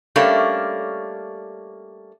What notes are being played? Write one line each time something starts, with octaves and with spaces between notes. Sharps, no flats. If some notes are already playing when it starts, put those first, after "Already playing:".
G3 A3 A#3 C#4 D4